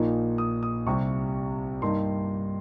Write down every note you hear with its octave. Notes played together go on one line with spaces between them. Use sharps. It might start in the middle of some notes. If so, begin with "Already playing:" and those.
Already playing: A#1 A#2 F3 A#3 D#4
D#6
D#6
C2 C3 G3 C#6
G2 G3 A#3 D#4 C6